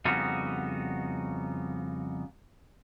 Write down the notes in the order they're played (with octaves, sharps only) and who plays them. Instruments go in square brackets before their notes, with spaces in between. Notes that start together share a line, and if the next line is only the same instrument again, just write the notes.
[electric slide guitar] F2 C#3 G3 B3 D#4 F#4